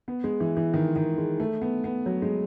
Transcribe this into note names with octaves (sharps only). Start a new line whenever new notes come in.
B3
G#3
E3
E3
D#3
D#3
G#3
A3
B3
B3
F#3
G#3